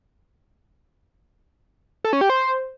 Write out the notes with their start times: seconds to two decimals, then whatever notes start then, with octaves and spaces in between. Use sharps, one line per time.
2.04 A4
2.13 C#4
2.21 G4
2.30 C5